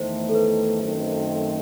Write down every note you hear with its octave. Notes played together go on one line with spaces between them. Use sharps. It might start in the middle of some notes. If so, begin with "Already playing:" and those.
Already playing: E2 D#3 A3 C5
A4
B4
F#2 D#3 A3 C4